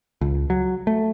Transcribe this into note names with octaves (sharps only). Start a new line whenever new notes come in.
C#2
F#3
A3